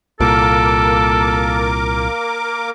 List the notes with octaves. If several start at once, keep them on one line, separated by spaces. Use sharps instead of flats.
C2 A#2 A#3 A4 A#4 D6